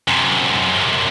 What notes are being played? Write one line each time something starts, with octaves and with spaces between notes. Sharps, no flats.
F#2 C3